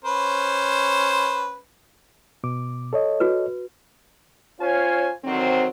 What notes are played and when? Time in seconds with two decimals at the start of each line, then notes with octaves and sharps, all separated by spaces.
0.04 C#4 B4 C5
2.44 B2 D6
2.93 A4 C#5 D#5
3.20 F#4 B4
4.60 C#4 F4 C5 C#5 G#5
5.24 D3 D#3 F#3 C4